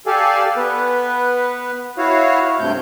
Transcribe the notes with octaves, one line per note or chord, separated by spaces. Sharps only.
G4 A4 D5 F5 G#5
B3 B4
E4 F#4 C#5 F5
G2 C3 A3 G6